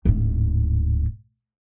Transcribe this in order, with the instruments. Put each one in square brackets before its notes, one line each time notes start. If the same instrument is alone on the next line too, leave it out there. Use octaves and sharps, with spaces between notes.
[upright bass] D1 G#2